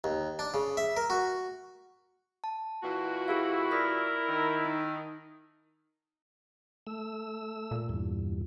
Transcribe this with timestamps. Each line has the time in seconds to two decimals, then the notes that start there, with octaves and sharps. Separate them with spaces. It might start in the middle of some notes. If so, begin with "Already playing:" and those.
0.04 D#2
0.39 D4
0.54 C#3
0.77 E5
0.97 A#4
1.10 F#4
2.44 A5
2.83 A#2 E3 F#4
3.28 E4 G4 G#4 F5
3.71 A#4 D5 D#6 B6
4.28 D#3
4.65 D#4
6.87 A3 E6
7.71 A#2
7.89 E2 G2